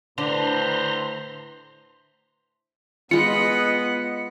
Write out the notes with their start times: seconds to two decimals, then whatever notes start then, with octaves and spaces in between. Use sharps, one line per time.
0.18 A2 D3 B4 C5 A#5 C6
3.11 G#3 B3 F4 D#5 B5 F#6 C#7